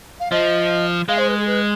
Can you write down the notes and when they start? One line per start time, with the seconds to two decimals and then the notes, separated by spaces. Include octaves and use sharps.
0.20 F5
0.32 F3 D#5
1.08 G#3 F5
1.18 C5
1.28 B4
1.37 G#4
1.47 B4